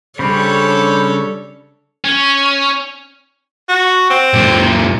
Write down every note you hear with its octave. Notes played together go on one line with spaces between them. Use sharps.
C#3 G3 C#4 D4 A4 C5 C#5 B5
C#4
F#4
C4
F#2 A#2